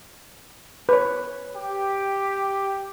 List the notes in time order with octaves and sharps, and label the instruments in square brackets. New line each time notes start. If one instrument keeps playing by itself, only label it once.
[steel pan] B4 C#5
[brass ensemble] G4